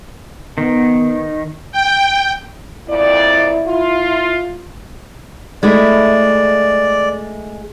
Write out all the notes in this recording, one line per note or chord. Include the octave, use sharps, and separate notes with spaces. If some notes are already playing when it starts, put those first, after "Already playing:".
D#3 B3
G5
F2 A#2 E4 D5
F4
G#3 A3 E4 D5